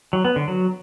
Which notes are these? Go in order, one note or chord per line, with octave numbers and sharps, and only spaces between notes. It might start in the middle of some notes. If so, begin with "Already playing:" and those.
F#3
B3
D3
F#3